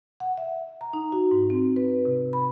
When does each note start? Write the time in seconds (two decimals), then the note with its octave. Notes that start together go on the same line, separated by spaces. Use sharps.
0.20 F#5
0.37 E5
0.81 A#5
0.93 D#4
1.12 F#4
1.31 G#2
1.50 C4
1.76 B4
2.05 C3
2.33 B5